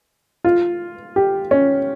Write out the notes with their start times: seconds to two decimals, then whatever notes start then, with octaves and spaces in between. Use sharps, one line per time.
0.45 F4
1.16 G4
1.51 C#4